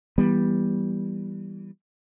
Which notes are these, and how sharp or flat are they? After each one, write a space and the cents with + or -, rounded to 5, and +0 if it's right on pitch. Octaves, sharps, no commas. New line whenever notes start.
E3 +0 G3 +0 B3 -25